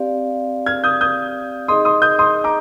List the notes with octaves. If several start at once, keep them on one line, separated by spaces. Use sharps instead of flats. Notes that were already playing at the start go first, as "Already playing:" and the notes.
Already playing: C4 G4 D5 F5
F6 G#6
D#6 G6
D#6 G6
D#4 G#4 D#5 C6 D#6
C6 D#6
D#6 G6
C6 D#6
A#5 D6